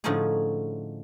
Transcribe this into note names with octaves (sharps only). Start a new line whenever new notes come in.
A2 D3 F3 C#4 D#4 G#4